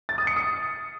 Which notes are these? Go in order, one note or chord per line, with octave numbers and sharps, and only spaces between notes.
A6
D#6
C#7
D#6